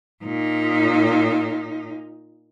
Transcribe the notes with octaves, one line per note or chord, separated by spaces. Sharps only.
A#2 D#4